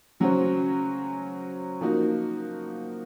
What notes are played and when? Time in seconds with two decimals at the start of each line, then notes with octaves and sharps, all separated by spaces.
0.20 C#3 F#3 C#4 F#4 C5
1.81 F3 A#3 D#4 F#4